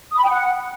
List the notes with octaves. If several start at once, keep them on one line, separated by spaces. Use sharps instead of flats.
D#6
B5
G5
F#5